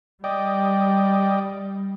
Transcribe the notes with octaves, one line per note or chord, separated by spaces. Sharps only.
G3 D5 D#5 G5